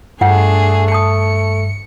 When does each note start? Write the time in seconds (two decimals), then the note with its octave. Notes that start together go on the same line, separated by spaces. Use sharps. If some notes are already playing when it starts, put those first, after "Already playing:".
0.21 G2 A3 D4 F4 G#4 F#5 G5
0.92 A5 D#6 C#7